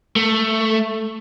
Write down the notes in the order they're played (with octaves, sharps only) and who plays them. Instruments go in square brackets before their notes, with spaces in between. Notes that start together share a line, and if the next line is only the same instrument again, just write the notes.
[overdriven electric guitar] A3